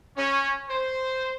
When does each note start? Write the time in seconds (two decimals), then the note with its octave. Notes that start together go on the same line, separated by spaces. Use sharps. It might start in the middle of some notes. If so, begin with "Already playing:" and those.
0.17 C#4
0.69 C5